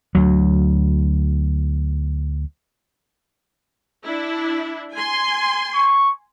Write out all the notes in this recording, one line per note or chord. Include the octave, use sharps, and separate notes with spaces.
D2 F#3
D4 E4
G#5 C6
C#6